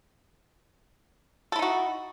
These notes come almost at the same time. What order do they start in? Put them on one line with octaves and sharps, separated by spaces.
A4 E4 D#4 F#4